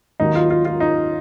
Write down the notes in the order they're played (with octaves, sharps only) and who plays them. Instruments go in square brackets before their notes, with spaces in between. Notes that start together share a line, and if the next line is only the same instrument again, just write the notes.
[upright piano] D#2 D#3 F#3 D#4
F4
F4
F4
D#4